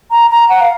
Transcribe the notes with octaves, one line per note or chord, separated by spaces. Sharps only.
A#5
A#5
F#5
F5